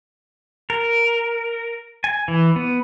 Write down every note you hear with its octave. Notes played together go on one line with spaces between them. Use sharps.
A#4
G#5
E3
B3